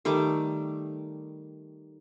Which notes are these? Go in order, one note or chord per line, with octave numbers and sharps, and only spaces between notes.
D#3 G3 A3 D6